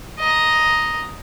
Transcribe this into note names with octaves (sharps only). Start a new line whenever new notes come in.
D#5 A#5